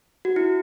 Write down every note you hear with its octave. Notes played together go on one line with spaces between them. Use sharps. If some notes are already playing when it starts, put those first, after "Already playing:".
F#4
E4